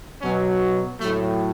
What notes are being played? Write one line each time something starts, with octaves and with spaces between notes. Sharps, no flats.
B2 F#3 C#4
A2 F#3 A3